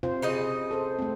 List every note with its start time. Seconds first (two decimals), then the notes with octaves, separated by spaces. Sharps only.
0.03 C3 F4 C5
0.22 C#3 D#4 D#5
0.71 A4 C5
0.99 A3 C4